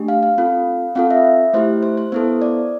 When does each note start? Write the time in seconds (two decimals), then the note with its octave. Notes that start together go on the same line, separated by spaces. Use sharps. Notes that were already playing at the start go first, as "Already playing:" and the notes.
Already playing: A3 D4 G4
0.08 F5
0.23 F5
0.38 C4 F4 A4
0.95 C4 F4 A4 F5
1.11 E5
1.53 A3 E4 G4 C5
1.83 C5
1.97 C5
2.12 B3 E4 A4 C5
2.42 D5